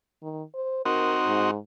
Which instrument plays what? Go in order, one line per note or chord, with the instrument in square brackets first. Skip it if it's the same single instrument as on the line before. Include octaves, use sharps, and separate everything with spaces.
[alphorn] D#3
C5
[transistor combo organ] C4 D#4 F#4 [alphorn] A#4
[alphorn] G#2